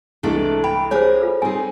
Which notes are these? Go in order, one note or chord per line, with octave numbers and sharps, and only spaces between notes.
C2 E3 G#3 A3 D4 A4
G5 B5
G4 G#4 A#4 C5 C#5
F4 A4 B4
G3 C4 D#4 G#4 G#5